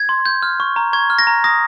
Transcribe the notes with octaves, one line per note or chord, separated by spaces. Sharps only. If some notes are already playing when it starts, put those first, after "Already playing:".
Already playing: G#6
C6
G6
F6
C#6
A#5
C#6 G#6
F6
A#6
A#5
D#6 A#6